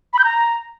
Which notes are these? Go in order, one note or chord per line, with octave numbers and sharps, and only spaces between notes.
B5
G6
A#5